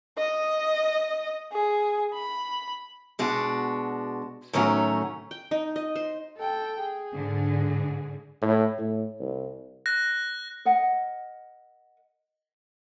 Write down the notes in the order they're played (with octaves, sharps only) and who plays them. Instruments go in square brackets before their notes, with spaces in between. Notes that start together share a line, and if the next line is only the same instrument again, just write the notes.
[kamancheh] D#5
G#4
B5
[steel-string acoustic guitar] B2 G#3 D4 F#4
A2 D#3 F#3 A3 C#4 F#4
[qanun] G5
D#4
D#5
C5
[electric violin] A4 G5
G#4
[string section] G#2 D3
[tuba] A2
A2
C2
[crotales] F#6 A#6
[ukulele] A#4 D#5 F#5